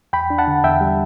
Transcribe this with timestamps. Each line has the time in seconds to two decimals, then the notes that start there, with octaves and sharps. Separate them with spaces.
0.13 E2 G5 B5
0.30 D4
0.38 F#5 A5
0.48 D3
0.64 E2 E5 G5
0.81 G3